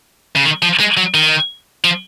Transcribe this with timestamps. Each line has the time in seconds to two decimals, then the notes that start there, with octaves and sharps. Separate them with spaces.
0.36 C#3
0.44 D#3
0.62 F3
0.80 G#3
0.97 F#3
1.14 D#3
1.84 F3